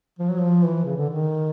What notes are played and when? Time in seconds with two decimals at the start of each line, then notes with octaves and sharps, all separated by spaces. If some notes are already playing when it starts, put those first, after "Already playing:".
0.19 F3
0.30 F#3
0.39 F3
0.65 E3
0.85 C#3
0.97 D3
1.10 D#3